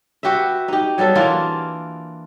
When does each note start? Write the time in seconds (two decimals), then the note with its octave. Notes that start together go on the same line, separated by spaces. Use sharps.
0.23 F#4 G4 B4 E5
0.68 D#4 G4
0.98 F#3 G3 B3 A4
1.15 E3 A#3 D4 F4